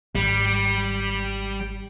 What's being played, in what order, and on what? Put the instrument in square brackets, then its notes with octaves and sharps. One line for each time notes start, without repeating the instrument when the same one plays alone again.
[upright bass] G#1 [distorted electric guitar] G3